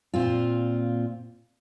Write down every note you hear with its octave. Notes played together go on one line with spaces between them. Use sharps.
A#2 C4 F4